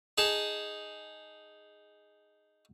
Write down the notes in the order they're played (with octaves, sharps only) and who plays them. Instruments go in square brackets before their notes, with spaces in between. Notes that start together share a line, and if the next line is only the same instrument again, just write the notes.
[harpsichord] D#4 G#4 A5